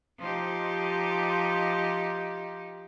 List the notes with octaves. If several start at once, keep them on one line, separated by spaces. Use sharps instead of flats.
F3 D#4 G4